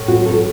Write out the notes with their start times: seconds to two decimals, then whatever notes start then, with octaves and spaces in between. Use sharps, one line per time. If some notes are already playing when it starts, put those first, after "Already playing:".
Already playing: A2
0.08 F#4
0.17 F#3
0.26 A4